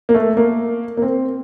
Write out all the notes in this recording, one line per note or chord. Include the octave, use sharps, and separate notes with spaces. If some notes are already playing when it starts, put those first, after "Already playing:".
A#3
A3
A#3
A#3
C4